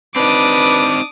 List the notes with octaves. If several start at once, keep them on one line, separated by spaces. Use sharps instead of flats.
C4 D4 D#4 B4 D6 D#6